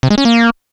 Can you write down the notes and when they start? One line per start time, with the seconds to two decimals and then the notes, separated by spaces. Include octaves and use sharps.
0.03 C3
0.10 G#3
0.18 C#4
0.25 A#3